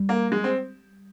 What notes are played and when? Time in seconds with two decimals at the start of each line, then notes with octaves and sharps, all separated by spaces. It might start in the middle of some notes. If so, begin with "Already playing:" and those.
Already playing: G3
0.09 A#3
0.32 G#3
0.44 C4